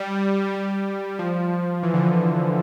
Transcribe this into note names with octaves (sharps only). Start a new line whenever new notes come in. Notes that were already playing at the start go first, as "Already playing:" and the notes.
Already playing: G3
G3
F3
E3
D3
E3